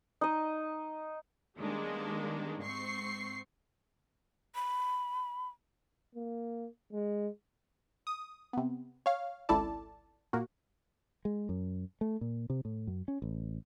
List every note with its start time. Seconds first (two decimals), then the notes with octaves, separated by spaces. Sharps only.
0.21 D#4 D#5
1.59 D#3 G3 G#3 A#3 B3 D4
2.62 G#2 C4 C#6 C7
4.55 B5
6.15 A#3
6.92 G#3
8.07 D#6
8.53 C3 B3
9.06 C#5 F5
9.49 G#1 C#2 E4 A4 D5 A5
10.33 A#2 A#3 F#4
11.25 G#3
11.49 F#2
12.01 A3
12.21 A#2
12.50 C3
12.65 A2
12.87 F#2
13.08 C#4
13.22 A1